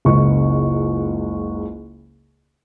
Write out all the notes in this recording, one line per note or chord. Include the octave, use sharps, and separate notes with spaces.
F#1 C#2 C#6